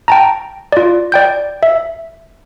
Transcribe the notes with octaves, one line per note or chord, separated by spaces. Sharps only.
G5 A5 A#5
F4 D5
D5 G5 G6
E5